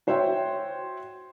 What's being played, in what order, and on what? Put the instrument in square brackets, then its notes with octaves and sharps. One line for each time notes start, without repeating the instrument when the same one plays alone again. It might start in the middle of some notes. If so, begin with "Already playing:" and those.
[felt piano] F#4 C5 C#5 E5 G5